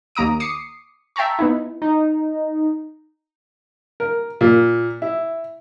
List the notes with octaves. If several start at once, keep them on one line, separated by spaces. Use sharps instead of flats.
D#2 A#3 A#5 D#6 D7
D6 D#6 C7 C#7
E5 G5 A5 A#5 C#6
B3 D#4 E4
D#4
A#4
A#2
E4